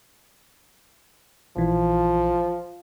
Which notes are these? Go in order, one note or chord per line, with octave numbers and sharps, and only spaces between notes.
A#1 E3 F3